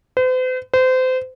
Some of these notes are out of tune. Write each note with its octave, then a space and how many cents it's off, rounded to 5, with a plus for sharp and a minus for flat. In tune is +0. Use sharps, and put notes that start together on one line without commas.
C5 -45
C5 -30